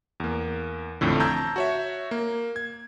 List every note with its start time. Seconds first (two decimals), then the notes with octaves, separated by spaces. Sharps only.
0.20 E2 A#3
1.01 A1 F2 A2 D3
1.20 A5 A#5 E6 G6 G#6
1.56 F#4 C#5 E5
2.11 A#3
2.56 G#6